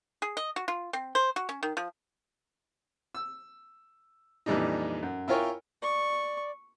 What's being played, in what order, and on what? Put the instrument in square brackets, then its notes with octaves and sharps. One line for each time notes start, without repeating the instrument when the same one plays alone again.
[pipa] G#4
D#5
F#4
F4
C4
C5
F#4
C#4
D#3
F3
[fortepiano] E6
F2 A#2 E3 G3 D4 D#4
F#2
E4 F4 A#4 C#5 G5 G#5
[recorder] D5 [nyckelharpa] C#6